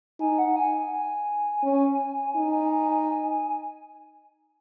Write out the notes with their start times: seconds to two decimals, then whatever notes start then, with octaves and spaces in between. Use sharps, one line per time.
0.20 D#4 G#5
0.39 F#5
0.56 G#5
0.74 G#5
0.93 G#5
1.63 C#4
2.36 D#4